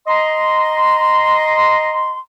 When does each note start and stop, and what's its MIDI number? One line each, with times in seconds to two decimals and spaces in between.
0.08 2.18 75
0.08 2.18 82
0.08 2.18 84